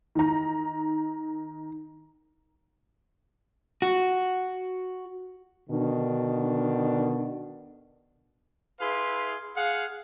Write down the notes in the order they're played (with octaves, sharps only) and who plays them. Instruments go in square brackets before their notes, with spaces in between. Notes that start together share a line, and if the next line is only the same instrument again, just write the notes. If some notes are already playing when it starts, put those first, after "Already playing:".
[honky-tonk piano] D#3 A#5
[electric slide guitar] F#4
[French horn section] B2 D3 D#3 D4
[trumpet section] E4 G#4 B4 F5 C6
G#4 F5 F#5